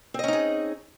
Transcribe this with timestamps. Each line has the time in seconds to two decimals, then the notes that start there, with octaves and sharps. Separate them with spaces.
0.14 C4
0.19 D#5
0.24 C#4
0.28 D#4
0.33 G#4